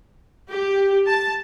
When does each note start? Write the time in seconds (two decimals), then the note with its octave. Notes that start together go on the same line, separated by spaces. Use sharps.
0.50 G4
1.07 A5